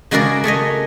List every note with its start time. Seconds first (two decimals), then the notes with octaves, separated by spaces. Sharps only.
0.11 C#3 G#3 F#4 G#4 A#4 D5
0.44 A3 G#4 C#5 D#5